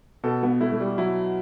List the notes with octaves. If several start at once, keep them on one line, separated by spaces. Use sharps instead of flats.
B2 A4
B3
A3 E4
A3
G3
F#3 E4